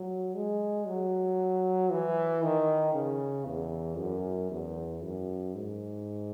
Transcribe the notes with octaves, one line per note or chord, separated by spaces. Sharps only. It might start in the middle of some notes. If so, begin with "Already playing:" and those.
Already playing: F#3
G#3
F#3
E3
D#3
C#3
E2
F#2
E2
F#2
G#2